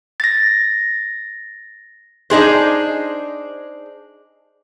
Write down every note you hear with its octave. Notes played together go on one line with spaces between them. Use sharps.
A6 A#6
D4 D#4 G#4 C5